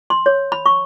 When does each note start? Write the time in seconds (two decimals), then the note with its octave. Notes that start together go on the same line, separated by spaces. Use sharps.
0.10 C6
0.26 C#5
0.52 B5
0.66 C#6